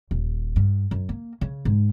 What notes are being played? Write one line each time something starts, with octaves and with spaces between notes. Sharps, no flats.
D#1
G2
F#2
A#3
C#3
G#2